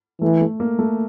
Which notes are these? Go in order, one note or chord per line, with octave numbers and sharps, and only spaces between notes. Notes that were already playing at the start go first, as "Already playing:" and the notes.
E3 A3
A3
A#3
A3